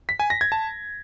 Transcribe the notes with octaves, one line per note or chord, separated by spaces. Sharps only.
B6
G#5
A#6
G#6
A5